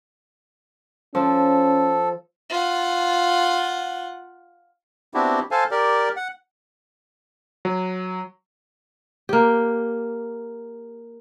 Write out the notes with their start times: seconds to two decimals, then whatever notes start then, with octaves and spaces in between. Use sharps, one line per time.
1.15 F3 C#4 A4
2.50 F4 F#5
5.14 B3 C4 D4 E4 F#4 G4
5.51 A4 C5 F5 G#5 A5
5.71 G4 A#4 D5
6.17 F#5
7.65 F#3
9.29 A#3 G4